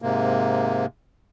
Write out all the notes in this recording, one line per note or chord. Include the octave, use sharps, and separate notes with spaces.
G#2 C3 A#3